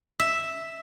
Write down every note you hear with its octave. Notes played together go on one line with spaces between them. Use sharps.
E5